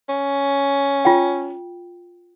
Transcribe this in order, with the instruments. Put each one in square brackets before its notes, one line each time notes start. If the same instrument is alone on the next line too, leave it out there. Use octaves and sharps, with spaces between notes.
[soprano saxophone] C#4
[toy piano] F4 G5